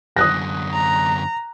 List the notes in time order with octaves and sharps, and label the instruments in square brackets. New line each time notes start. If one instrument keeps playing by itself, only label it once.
[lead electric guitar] F#2 D3 [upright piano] D#6 F#6 A#6
[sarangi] A#5